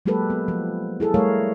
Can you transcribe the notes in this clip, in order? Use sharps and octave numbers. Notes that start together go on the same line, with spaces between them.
F#3 G#3 A#3 G4 A4 B4
B3
F3
E4 G#4 A4
G3 A3 A#4 C#5 F5